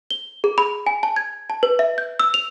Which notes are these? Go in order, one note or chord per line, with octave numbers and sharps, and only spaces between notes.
G7
G#4
B5
G#5
A5
G#6
A5
B4
E5
G6
E6
F7